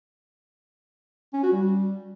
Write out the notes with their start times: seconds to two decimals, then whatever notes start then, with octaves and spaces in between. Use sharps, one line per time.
1.33 C#4
1.43 F#4
1.52 G3